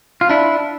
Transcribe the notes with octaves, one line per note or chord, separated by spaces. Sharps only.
F4
D4 E4